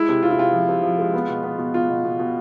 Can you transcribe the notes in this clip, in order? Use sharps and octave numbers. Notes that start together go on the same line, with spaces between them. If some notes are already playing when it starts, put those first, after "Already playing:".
Already playing: G#3 E4
C3
C3 F4
E4
C3 F4
F3
C3
F3
G#3
B3
B2
B3
B2
B2 F4
B2
B2
B2